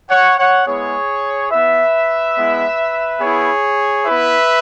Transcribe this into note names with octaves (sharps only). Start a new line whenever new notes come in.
C#5 F#5
C#5 F#5
G#3 B3 E4 G#4 C#5
B3 E4 B4 E5
G#3 B3 E4
B3 E4 G#4 C#5
B3 E4 B4 E5